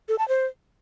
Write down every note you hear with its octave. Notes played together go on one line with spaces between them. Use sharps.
A4
A5
C5